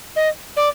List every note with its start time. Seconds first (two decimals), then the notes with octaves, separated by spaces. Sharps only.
0.16 D#5
0.57 D5